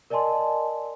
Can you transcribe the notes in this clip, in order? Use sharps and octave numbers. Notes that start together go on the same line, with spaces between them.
A#4 D5 D#5 G#5 A5 C6